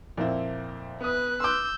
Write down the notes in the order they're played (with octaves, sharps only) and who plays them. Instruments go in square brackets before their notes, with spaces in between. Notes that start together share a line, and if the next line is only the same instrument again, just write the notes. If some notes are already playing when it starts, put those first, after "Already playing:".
[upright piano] F2 E4 [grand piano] A#2 A#3 C4
[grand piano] B3 D#6 [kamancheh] B4 F#6
[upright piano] C6 D6 [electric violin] E6 G6